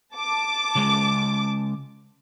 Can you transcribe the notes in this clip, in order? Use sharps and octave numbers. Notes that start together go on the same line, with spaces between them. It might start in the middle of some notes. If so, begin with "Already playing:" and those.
A5 D6
C#3 G#3